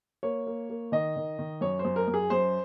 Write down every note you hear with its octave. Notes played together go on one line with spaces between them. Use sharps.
A#3 C#5
A#3
A#3
D#3 D#5
D#3
D#3
F#2 C#5
C5
F#2
A#4
F#2
G#4
F#2 C5